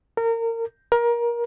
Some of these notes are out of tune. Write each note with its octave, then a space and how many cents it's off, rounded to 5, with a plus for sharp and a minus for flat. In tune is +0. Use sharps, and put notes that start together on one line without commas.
A#4 -25
A#4 +25